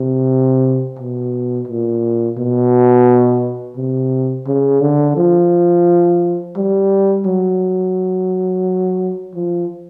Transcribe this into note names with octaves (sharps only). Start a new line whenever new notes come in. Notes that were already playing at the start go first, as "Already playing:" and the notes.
Already playing: C3
B2
A#2
B2
C3
C#3
D3
F3
G3
F#3
F3